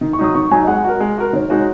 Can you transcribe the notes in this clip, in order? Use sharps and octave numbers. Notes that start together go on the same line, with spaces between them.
D#3
C#6
F#3 D#4 D#6
D#3 C#6
F#3 D#4 G#5
D#5
G#3 F#5
F#4 A#4
G#3
F#4 A#4
D#3 C#5
G#3 D#4 F#4